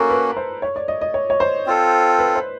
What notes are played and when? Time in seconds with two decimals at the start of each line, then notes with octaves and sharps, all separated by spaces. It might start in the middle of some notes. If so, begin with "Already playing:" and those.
Already playing: A#3 C#4 F#4 A4 A#4
0.10 B4
0.37 C5
0.62 C#5
0.76 D5
0.88 D#5
1.01 D#5
1.14 C#5
1.30 C#5
1.40 C5
1.66 C4 F4 A4
2.19 B4
2.36 C5